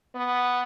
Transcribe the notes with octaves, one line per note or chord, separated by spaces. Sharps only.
B3